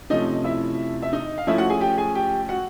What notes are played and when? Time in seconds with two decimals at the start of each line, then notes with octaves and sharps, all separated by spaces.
0.10 C3 F3 A3 C#4 D#4 D#5
0.44 E4 E5
1.02 E5
1.13 D#4 D#5
1.38 F5
1.47 F3 A3 C#4 E4 E5
1.58 F#4 F#5
1.70 G#4 G#5
1.81 G4 G5
1.97 G#4 G#5
2.15 G4 G5
2.49 F#4 F#5